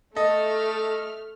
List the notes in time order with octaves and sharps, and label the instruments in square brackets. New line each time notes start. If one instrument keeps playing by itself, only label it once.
[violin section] A3 F6 [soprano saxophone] A4 [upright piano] D#5